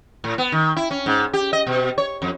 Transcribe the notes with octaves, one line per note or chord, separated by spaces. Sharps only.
A2
B3
D#3
E4
C#4
G#2
G4
D#5
B2
C#5
F2